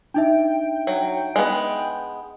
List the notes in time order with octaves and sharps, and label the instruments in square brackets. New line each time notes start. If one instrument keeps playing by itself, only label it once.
[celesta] D4 D#4 E5 [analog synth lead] G5
[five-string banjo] F#3
G#3 B3